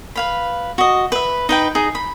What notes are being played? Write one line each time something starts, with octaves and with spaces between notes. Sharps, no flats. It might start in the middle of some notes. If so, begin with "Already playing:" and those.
B4 F5 B5
F#4 D#5
B4 E5
D#4 B4 G5
D#4 G#4
B5